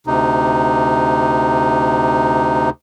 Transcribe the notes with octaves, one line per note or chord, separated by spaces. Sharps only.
D2 C3 D#4